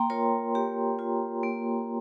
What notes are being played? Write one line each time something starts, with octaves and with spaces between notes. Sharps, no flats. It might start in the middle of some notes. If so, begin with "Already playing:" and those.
Already playing: A#3 G5 A#5 C6
F4 A#4 C#5
A#3 G4
F4
A#3